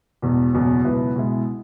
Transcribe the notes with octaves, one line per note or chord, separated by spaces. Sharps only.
E1 E2 B2
F#1 E2 B2 F#3 C#4
C#2 B2 F#3 E4 B4
B2 G#3 E4